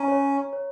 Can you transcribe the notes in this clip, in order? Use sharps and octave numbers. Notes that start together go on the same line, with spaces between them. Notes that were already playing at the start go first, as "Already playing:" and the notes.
Already playing: C#4 A#5
C#5
C#5